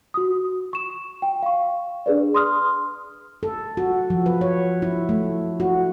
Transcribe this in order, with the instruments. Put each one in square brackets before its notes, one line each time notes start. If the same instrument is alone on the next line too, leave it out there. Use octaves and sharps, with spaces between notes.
[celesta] F#4 D#6
C#6 E7
G5
F5 C#6
D4 G#4 B4 D5
C6 D#6 F6
[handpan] A4
F#4
F3
B4
C#5
E4
A3
F#4